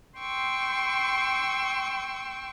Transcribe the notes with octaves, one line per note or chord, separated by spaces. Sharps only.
G5 C6 C#6 E6